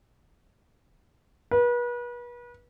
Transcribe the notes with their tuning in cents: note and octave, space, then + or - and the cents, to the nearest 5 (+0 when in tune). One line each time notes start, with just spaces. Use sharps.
B4 -35